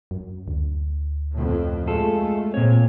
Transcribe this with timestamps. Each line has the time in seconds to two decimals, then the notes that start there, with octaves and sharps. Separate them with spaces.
0.11 F#2
0.48 D2
1.31 F2 A2
1.87 G#3 A3 F4 A4
2.54 A#2 C4 C#5